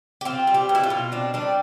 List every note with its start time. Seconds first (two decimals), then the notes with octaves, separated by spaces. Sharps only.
0.21 G4
0.25 C4 F4
0.47 G3
0.54 G4
0.69 B2
0.75 E4
0.84 F4
0.90 B2
1.12 C4 D4
1.34 G3 D4